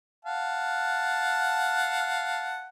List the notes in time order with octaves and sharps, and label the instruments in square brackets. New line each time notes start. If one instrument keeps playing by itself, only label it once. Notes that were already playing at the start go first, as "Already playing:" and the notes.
[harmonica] F5 F#5 A5